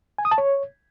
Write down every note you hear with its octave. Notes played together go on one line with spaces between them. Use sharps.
G#5
D#6
A5
C#5